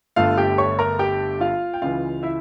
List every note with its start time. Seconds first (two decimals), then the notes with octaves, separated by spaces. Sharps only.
0.16 G1 G2 D3 A3 F4 F5
0.37 G4 G5
0.58 C#5 C#6
0.79 A#4 A#5
0.99 G4 G5
1.41 F4 F5
1.73 G5
1.82 C#2 C#3 E3 F4 F5
2.23 E4 E5